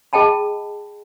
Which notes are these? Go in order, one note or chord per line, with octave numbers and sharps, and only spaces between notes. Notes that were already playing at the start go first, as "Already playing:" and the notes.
G#4 D#5 G5 A5 B5